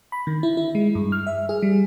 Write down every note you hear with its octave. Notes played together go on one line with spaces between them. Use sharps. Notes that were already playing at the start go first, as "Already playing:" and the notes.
B5
D#3
E4
E4
G#3
G2
F6
E5
G#4
G3